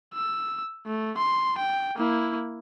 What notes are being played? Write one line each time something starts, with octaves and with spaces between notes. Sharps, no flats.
E6
A3
C6
G5
A#3 E4